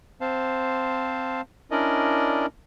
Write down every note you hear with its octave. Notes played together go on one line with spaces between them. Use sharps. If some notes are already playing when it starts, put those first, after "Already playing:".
C4 C5 F5 A5
C#4 D4 E4 A#4 D5 D#5